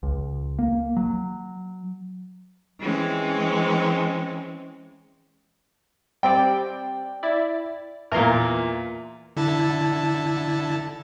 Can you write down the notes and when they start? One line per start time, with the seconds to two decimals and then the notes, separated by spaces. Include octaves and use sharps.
0.03 C#2
0.59 A#3
0.97 F#3
2.80 E3 G#3 C4 C#4
6.23 G3 C4 D5 G5
7.23 E4 D5
8.12 E2 A#2 A#4 A#5 C6
9.37 D3 E4 A5